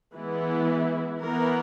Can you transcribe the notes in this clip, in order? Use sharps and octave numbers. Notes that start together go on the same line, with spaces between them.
E3 G#3 B3 E4
E3 B3 A#4